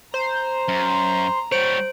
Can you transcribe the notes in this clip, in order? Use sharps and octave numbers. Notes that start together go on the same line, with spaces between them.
C5 A#5
F#2
G3 C5 C#5 D7